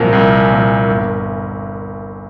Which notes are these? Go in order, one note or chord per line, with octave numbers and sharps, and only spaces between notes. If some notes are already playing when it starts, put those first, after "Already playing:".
Already playing: C2 A#2 F3 A#4
C2
A#2 F3
G1